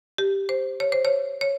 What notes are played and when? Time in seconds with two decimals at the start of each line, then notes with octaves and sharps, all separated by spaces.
0.18 G4
0.49 C5
0.80 C#5
0.92 C5
1.05 C#5
1.41 C#5